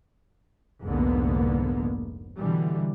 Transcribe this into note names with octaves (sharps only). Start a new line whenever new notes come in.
F1 C2 G#2 D3 A#3 B3
B2 D3 E3 G3